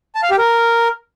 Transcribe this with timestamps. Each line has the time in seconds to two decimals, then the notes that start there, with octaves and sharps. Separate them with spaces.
0.15 A5
0.23 F5
0.30 G4
0.38 A#4